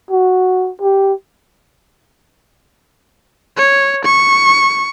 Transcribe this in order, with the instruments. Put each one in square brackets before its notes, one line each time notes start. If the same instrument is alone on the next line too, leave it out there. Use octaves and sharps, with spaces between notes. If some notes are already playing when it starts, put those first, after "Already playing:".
[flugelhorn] F#4
G4
[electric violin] C#5
C#6